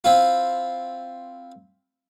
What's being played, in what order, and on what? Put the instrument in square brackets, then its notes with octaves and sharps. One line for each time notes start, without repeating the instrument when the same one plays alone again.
[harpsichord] C4 E4 F4